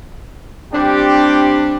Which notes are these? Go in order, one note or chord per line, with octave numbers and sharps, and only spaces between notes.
G3 C4 D4 F4 G4